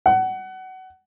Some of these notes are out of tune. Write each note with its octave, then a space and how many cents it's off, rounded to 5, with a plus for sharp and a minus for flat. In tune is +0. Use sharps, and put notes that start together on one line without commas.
F#5 +25